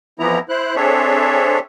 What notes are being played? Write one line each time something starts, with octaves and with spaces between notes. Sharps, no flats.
F2 E3 F3 B3 E4 A#5
E4 C5 F#6
C4 D4 G#4 A4 C#5 E5